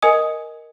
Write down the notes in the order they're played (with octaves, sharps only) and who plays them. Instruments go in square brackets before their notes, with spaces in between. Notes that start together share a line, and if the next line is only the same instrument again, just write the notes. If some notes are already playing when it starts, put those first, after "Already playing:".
[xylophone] A#4 D#5 G#5 D#6